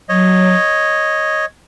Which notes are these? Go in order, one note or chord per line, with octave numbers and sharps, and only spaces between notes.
F#3 C#5 D#5